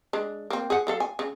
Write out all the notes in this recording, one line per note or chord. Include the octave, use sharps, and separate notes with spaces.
G#3 D4
A#3 C4
G#4 F#5
F#3 A4 F5
G#5
C#3